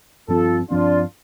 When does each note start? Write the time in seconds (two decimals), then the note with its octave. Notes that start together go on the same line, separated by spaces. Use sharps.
0.28 G2 F3 C4 F4 A4
0.70 G2 F3 C4 D4 F4